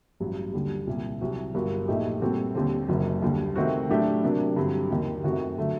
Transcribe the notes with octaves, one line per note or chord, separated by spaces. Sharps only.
A1 G2 F#3
D#2 D3 G3
C2 A#2 G3
C2 C3 F#3 C4 F#4
G1 G2 F#3 A#3 F#4
A#1 A#2 A3 D#4 G4
A#2 G3 C4 F#4 A4
D#2 D3 G3 C4
F#1 F#2 D#3 F#3
D#2 D3 G3
C3 D#3 A3 C4 F#4
A2 F#3 A3 D4 G4
C3 F#3 A#3 D4
G2 D3 F#3 C4
D#2 D#3 F#3
F#2 D#3 A3 C4 F#4
D3 F#3 A3